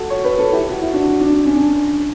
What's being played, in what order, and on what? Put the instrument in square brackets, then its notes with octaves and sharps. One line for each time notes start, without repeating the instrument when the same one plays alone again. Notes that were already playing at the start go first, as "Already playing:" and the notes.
Already playing: [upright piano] F#4 A4
C#5
B4
A4
E4 G4
F#4
E4
D4 F#4
D4
C#4
D4